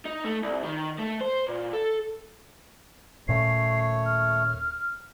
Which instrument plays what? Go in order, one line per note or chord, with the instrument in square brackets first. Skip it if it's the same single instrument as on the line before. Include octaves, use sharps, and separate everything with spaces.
[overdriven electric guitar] D#4
A3
C2
D#3
A3
C5
A#2
A4
[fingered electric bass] D#1 A#2 C#4 [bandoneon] A3 C#5 [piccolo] C7
[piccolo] F6